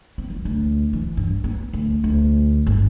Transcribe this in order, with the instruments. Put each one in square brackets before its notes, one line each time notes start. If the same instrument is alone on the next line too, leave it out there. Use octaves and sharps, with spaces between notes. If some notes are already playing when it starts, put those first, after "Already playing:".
[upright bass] C4
F3
D2
E3
G2
B3
D2
D2
G1